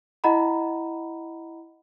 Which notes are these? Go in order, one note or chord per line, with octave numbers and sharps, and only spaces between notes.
E4 D#5 F#5 A#5 B5